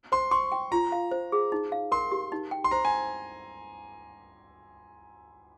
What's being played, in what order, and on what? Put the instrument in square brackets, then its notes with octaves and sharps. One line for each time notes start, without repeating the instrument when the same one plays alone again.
[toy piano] C5 [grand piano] C6
[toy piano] C6 [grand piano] C#6
[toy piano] G5
[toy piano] F4 [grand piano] A#5
[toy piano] F5
C5
G#4
D#4
F5
[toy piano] A#4 [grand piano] C6
[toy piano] G4
D#4
G5
[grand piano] C6
[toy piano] C5 [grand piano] A#5
[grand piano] G#5